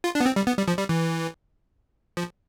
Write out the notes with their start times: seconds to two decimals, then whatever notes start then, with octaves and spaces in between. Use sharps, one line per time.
0.04 F4
0.15 D4
0.20 B3
0.26 C4
0.36 G3
0.47 B3
0.58 G3
0.68 F3
0.79 G3
0.89 E3
2.17 F3